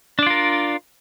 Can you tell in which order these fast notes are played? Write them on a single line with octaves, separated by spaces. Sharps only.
D4 D5 F4 A#4